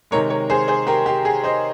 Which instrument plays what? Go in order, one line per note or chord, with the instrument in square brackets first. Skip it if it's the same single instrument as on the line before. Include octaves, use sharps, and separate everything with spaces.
[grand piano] C3 D#3 G#3 A#4 C#5
A#4 C#5
G#4 C5
G#4 C5
G4 A#4
G4
G#4
C5 D#5